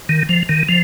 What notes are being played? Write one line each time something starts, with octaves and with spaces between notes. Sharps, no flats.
D#3
F3
D#3
F3